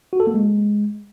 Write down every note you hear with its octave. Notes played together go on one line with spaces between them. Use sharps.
F#4
A4
A#3
G#3